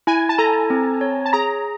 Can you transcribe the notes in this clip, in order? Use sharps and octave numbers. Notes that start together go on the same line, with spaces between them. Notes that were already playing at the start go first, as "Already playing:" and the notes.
E4 G#5
A5
A4 A#5
C4
C#5
A5
G#4 A#5